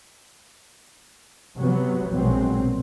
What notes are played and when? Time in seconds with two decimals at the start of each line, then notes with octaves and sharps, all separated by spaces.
1.57 C3 F#3 B3
2.13 A#1 B2 F#3 G#3 C4